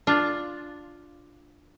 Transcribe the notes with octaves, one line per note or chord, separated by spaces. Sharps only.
D4 F4